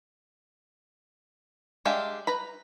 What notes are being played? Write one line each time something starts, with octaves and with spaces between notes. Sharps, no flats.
G#3 D4 G4 E5 F5
B4 A#5 B5